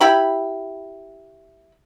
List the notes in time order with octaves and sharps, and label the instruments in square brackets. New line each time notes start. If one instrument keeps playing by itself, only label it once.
[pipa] E4 G4 B5